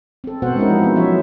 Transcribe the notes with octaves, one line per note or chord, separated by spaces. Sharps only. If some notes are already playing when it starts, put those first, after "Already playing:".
C4 A4
B2 B3 F#4 C5 F#5
G#3 C4 C#4 D#4 E4 A#4
F3 F4
B3
F3 F#3 C#4 C#5 E5